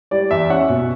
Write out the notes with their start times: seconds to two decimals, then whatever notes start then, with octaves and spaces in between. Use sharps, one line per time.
0.11 G3 D5
0.31 E2 E5
0.50 C#4 F#5
0.69 B2